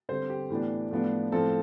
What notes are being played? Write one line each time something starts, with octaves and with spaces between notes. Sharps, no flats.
D3 G3 C4 C5
G4
A2 E3 B3 D4
A2 F3 B3 D4
A2 F3 C4 A4